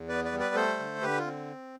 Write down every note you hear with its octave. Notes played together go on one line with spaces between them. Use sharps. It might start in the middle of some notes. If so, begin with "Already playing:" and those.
Already playing: E2
B3 B4 D5
B4 D5
G3
B4 D5
A3 A4 C5
D3
D3 G4 B4
F4
C4